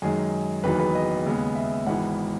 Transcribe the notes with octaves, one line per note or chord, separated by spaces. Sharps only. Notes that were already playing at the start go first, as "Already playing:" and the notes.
F#2 D#3 G#3 G#4
F#1 E2 D#3 F#3 B3 B4
B4
D#5
D#2 C#3 G#3 B3
E5
G#1 G#2 E3 B3 F#5